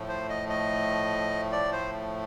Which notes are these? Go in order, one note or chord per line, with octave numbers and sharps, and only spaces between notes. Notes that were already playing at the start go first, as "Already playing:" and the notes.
Already playing: A2 F3 A3
C5
D#5
D#5
D5
C5